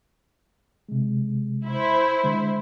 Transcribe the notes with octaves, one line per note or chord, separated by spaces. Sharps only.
C3 G#3
E4 C5
D3 G#3